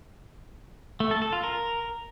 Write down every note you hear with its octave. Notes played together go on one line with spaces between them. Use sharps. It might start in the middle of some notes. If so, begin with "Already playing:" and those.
A3
A4
A4
F4
A#4